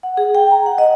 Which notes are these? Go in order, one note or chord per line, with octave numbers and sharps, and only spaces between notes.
F#5
G#4
G5
A#5
F#5
D#5